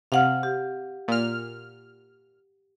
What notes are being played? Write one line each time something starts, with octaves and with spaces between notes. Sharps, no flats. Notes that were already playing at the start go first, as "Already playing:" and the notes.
C3 F5 F#5 F6
G4
A#2 F6